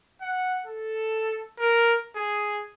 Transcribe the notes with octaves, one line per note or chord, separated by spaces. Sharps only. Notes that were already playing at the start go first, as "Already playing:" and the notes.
F#5
A4
A#4
G#4